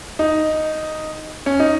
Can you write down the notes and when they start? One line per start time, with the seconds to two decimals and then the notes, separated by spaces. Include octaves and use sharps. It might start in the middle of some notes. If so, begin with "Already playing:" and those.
0.19 D#4
1.46 C#4
1.60 D#4